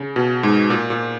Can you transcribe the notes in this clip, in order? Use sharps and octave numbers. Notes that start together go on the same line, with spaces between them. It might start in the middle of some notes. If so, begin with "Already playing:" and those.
Already playing: C#3
B2
G#2
A#2
A#2